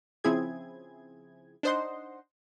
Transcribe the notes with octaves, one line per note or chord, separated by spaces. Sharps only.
C#3 F3 C4 E4 G#4 G#6
D4 D#4 C5 D#5 F#5 C6